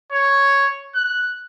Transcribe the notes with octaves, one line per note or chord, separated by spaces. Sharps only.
C#5
F#6